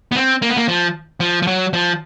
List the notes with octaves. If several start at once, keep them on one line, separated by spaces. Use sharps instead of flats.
B3
C4
A#3
B3
A#3
F3
F3
F3
F#3
F3